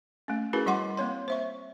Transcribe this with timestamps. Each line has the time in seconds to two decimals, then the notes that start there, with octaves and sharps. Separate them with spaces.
0.28 A3 C#4
0.53 C#4 E4 F#4 G#4 A#4 B4
0.66 G3 D#5 F#5 C6 D6
0.97 A#3 C4 C#5 C6
1.28 C5 E5 C#6